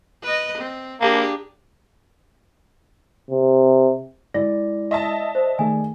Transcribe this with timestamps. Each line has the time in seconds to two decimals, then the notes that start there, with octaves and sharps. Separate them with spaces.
0.22 B4 D#5
0.58 C4
1.01 A#3 D4 G4 G#4
3.31 C3
4.34 G#3 E4 D5 A#6
4.91 D#5 E5 A5
5.35 C5
5.59 D#3 A3 G#4 G#5